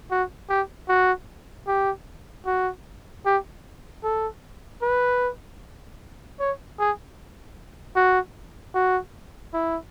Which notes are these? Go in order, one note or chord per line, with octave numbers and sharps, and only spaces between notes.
F#4
G4
F#4
G4
F#4
G4
A4
B4
C#5
G#4
F#4
F#4
E4